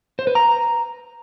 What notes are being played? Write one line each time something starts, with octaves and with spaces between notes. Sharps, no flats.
C5
B4
A#5